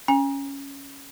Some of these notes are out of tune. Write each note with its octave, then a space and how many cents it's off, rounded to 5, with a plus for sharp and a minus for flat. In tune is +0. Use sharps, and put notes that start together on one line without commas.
C#4 +0 G#5 -35